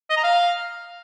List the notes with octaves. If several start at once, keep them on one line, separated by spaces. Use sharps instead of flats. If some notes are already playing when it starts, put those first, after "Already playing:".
D#5
A#5
F5